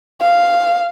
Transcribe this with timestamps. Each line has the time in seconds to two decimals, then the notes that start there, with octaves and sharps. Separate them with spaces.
0.21 F5